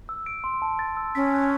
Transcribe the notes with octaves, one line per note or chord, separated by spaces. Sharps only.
E6
D7
C6
A5
A6
E6
C#4 B6
F#6